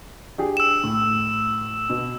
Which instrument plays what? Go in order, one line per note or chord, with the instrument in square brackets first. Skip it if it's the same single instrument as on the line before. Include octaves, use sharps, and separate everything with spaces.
[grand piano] D4 G4 G#4
[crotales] E6 E7
[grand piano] A2
B2